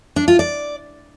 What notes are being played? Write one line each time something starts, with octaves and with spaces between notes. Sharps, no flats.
D4
F4
D5